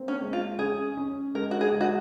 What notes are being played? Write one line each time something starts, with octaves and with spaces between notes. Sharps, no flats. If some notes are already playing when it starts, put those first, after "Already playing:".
Already playing: A#3 C4
C#4
G#3
F4
C#4 G#4
C#4
G#3 A#4
F#4
G#4
G#3
F#4